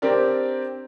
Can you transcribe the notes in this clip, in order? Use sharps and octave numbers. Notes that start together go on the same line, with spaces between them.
C4 D4 G4 A#4 D5